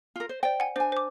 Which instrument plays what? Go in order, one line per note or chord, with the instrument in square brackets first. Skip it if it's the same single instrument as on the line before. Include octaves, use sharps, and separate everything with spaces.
[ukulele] F4 A#4
C5
[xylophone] C5 D5 [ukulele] G5
[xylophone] F#5 G#5
[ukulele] D4 G#5 [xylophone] C5
[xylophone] C5 D6